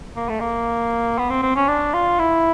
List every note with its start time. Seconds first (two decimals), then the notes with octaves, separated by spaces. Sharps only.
0.16 A#3
0.29 A3
0.40 A#3
1.18 B3
1.30 C4
1.42 C4
1.56 C#4
1.68 D4
1.94 F4
2.19 E4